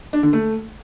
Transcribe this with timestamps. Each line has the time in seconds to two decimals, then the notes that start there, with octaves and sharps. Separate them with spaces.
0.13 D4
0.23 D3
0.33 A3